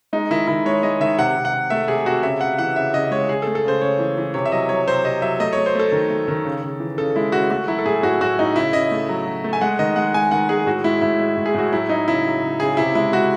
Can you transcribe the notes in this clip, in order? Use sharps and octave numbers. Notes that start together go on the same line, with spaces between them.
G#3 D#4
D#3 E4
D#3 E4
G#3 C#5
G#3 D#5
D#3 E5
C3 F#5
C3
F#5
C3
A3 E5
C3 G#4
C3 F#4
C#3 E5
C#3 F#5
E3 F#5
C#3 E5
C#3 D#5
G#3 C#5
C#3 G#4
A4
A3
A4
C#3 C5
C#3 C#5
E3
E3
C3 C#5
E5
F#3 D#5
F#3 C#5
C3 C5
C3 D#5
F#3 E5
A3 D#5
A3 C#5
C5
A3 A4
D#3
A3
D#3
C#3
C#3
E3
C#3 A4
G#3 E4
C#3 F#4
A3 F#4
F#3 E4
A4
A2 G#4
A2 F#4
A2 F#4
A2 D#4
C#3 E4
C#3 D#5
A3
F#3
F#3
A3
G#5
G#3 F#5
D#3 D#5
G#3 F#5
G#3 G#5
D#3 F#5
G#3 G#4
A2 F#4
G#3 E4
A2 E4
G#3
A2
G#4
A2 F#4
F#3 E4
F#3 D#4
C#3 E4
F#3
C#3
C#3 G#4
C3 E4
G#3 E4
G#3 F#4